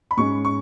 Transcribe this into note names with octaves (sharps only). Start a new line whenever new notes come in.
B5
G#2 G#3 C#4 C#6
C#6